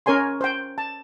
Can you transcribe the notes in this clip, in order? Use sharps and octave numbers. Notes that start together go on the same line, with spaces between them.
C#4 A#4 C#5 G#5 C6
C5 G5
A5